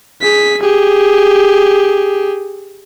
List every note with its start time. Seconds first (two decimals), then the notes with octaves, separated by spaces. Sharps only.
0.21 G#4 B6
0.61 G4 G#4